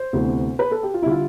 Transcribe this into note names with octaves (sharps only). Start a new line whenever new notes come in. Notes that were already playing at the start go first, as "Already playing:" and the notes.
Already playing: C5
D2 C3 E3 B3
B4
A4
G4
F4
E4
D3 G3 F4